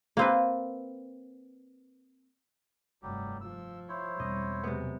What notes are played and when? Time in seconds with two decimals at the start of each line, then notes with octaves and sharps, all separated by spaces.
0.17 A#3 C4 B4
3.03 F1 G2 F#3 G3 G4
3.41 F3 E6
3.89 E4 C5 C#5
4.20 E2 B2 G3 C4 D#5
4.64 C3 F#3 G#3 B3